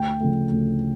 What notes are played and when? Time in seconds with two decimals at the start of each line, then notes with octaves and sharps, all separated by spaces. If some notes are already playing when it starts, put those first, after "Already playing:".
Already playing: D2 G5
0.20 C#3 F3 A3
0.51 D2